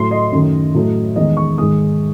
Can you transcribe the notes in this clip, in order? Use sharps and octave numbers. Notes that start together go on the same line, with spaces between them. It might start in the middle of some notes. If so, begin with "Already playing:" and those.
Already playing: A2 F#3 A3 C6
D#5
F#2 D#3 F#3 A3
A2 F#3 A3
E2 D#3 G#3 D#5
C#6
G#2 D#3 G#3 D#6